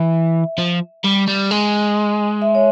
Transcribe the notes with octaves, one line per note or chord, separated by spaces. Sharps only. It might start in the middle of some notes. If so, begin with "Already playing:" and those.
Already playing: E3 E5
F3
G3
G3
G#3
E5
C#5